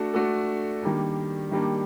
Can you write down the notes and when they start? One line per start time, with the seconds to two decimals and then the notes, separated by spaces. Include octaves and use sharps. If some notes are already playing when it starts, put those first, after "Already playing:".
Already playing: A3 D4 F#4 A4
0.14 A3 D4 F#4 A4
0.83 D#3 G3 A#3 D4
1.51 D#3 G3 A#3 D4